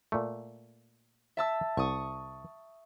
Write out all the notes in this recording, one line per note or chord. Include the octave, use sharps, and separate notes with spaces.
A#2 A3
E5 A5 E6
C2 C#6 D#6